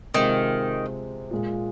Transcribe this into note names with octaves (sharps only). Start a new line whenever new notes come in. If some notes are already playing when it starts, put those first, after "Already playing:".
C3 D#3 G#3 C4 F4
A#2 G#3 F4